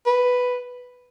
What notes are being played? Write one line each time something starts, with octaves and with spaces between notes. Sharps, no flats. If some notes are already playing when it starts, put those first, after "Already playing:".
B4